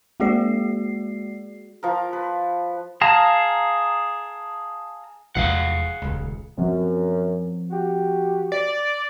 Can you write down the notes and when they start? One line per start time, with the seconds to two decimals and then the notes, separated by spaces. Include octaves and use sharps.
0.20 G#3 A#3 F#4 G#4 D5 C7
1.83 F3 A#4
2.13 B4
3.01 G#4 F5 A5 A#5
5.35 F1 E2 G#3 G#4 F5 F#5
6.02 D#1 C#2
6.58 F#2 F3 C4
7.71 F#4 G4
8.52 D5